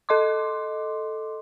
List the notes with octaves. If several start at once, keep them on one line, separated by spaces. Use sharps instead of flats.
A4 D#5 C6 D6